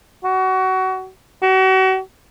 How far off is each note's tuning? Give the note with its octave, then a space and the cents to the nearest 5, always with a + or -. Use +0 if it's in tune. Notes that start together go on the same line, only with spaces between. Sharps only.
F#4 +25
F#4 +35